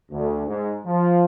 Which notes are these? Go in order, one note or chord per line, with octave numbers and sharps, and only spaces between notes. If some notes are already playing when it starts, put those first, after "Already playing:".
D2
G#2
F3